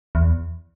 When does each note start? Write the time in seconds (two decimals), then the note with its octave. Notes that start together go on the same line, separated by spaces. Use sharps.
0.15 E2